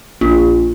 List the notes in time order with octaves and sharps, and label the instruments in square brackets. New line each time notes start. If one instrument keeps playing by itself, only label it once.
[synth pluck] A#1